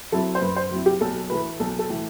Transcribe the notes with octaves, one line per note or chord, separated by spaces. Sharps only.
F#3 C4 E4 A4
C5
F#2 B4
C5
F#3 C4 E4
G4
B1 A4
A2 E3 A3 B4
B1 A4
A4
A2 E3 A3